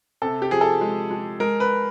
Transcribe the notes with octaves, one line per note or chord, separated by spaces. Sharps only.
C3 A4
G4
F3 G#4
A4
G#3
G#3
G#3 A#4
B4